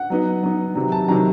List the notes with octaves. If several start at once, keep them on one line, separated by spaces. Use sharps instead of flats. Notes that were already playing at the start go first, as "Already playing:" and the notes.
Already playing: F#5
F#3 B3 D#4
F#3 B3 D#4
C3 D#3 F#3
A5
C3 D#3 F#3 A#5